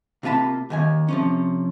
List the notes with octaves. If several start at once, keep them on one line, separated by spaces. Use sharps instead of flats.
C3 A#3 F4 A5 B5
D#2 D#3 G#5
C3 F3 C#4